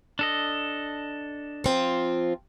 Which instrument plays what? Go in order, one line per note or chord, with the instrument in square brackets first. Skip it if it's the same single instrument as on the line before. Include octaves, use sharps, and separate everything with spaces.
[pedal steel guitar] D4 A4 D#5
[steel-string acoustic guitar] F3 C4 F4